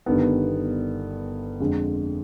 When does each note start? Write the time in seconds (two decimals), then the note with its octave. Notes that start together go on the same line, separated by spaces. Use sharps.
0.06 G1 G2 D#3 B3
1.60 F2 D3 G#3